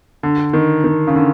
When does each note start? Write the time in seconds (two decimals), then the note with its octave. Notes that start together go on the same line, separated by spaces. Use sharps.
0.23 D3
0.53 D#3
0.84 D#3
1.07 C#3
1.15 D3